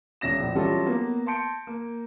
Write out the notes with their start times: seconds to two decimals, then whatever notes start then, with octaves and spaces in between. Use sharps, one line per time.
0.21 E1 C#4 A#6 E7
0.40 A#1
0.55 E3 F#3 G3 C#4 F4 A4
0.86 A#3 B3
1.26 A5 C6 G6 C#7 D7
1.67 A#3